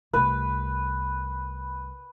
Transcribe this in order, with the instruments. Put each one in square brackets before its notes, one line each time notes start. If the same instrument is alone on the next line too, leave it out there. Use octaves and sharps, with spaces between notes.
[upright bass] C2 A3 [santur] B4